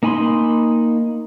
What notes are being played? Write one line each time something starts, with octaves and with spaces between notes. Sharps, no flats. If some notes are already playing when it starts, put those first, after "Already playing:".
A#3 D#4 G#5 B5 C6